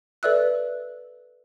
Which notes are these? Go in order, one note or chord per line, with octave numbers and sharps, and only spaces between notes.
A4 B4 D5 E5 E6 F#6